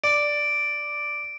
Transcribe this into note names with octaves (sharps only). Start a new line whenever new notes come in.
D5 D7